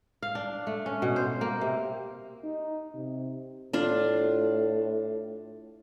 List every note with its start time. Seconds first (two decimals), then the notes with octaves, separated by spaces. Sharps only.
0.23 F5
0.35 D4
0.67 A3
0.86 C#4
1.02 B2
1.16 C5
1.41 A#3
1.61 C3
2.43 D#4
2.94 C3
3.73 A2 D4 F4